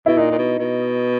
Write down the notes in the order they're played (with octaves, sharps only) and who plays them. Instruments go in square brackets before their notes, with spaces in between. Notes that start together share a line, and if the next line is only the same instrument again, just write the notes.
[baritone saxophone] B2 [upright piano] E4
[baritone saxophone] A#2 [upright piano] D#4
[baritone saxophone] A#2
B2
B2